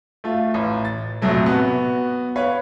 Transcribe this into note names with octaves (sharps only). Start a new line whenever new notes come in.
A3 F4
A1
A6
A#1 F2 C3 F#3 A3
B3 F#4
B4 C#5 F5 B5